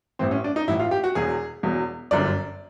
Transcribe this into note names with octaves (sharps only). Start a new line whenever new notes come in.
A1 A2 E3 C4
C#4
D4
D#4
A1 A2 E3 E4
F4
G4
F#4
E1 E2 B2 G#4
E1 E2 B2
G1 F#2 D3 D5